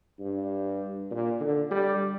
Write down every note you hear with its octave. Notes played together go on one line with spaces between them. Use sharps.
G2
A#2
D3
G3